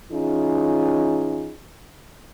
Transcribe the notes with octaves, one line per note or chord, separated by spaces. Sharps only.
E3 C#4 D#4 F4 G#4